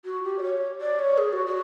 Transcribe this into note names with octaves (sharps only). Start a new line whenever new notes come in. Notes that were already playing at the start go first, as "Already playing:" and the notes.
F#4
G4
D5
C#5
D5
C#5
G#4
F#4
F#4